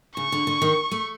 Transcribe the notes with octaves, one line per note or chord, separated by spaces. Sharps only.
C#3 C#6
D3
D3
D#3
A3